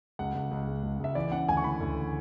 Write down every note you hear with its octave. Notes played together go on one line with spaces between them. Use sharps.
C#2 F#5
C#2
C#2
G#3
C#2
C#2 E5
E3 D5
C#3 F#5
D2 G#5
C#6
E3 B5
D2